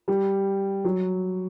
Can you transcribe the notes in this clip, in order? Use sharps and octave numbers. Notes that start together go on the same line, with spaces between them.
G3
F#3